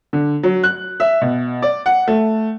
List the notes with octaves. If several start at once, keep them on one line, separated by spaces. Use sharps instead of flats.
D3
F#3
F#6
E5
B2
D5
F#5
A3